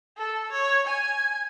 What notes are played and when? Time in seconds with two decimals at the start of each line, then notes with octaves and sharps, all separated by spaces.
0.17 A4
0.52 C#5
0.87 G#5